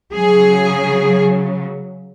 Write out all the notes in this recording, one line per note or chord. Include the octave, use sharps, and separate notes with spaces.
C#3 F#3 G#4